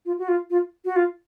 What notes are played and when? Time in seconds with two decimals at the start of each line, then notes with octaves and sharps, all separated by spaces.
0.06 F4
0.19 F#4
0.28 F4
0.50 F4
0.85 F#4
0.96 F4